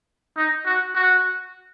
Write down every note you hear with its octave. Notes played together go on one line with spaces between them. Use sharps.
D#4
F#4
F#4